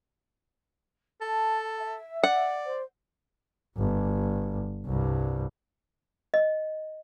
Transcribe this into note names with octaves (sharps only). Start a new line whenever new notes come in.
A4 A5
E5
D5 F#5
C5
G1
C2 G2
D#5